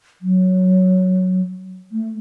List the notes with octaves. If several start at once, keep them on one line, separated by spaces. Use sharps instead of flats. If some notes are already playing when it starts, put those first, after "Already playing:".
F#3
A3